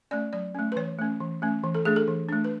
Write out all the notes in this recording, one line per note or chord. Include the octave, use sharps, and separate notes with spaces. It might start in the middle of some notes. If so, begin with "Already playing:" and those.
A3 C#4 D5
F#3 D5
A3 C#4
B4
E3 C#5
A3 C#4
E3
A3 C#4
E3
A4
A3 D4 G#4
A4
E3
A3 D4
B4